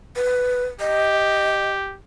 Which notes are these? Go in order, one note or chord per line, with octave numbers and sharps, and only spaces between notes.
B4
G4 D#5